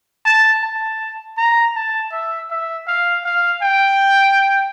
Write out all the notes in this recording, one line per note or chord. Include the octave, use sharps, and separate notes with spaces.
A5
A5
A#5
A5
E5
E5
F5
F5
G5